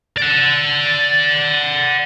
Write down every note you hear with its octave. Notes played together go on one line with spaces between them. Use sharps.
D5 F#5